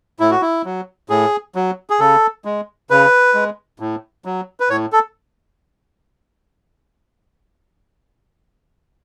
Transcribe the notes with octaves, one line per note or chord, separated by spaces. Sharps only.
A2 E4
F#4
E4
F#3
A2 G#4
F#3
G#4
C#3 A4
G#3
C#3 B4
G#3
A2
F#3
B4
A2 C#5
A4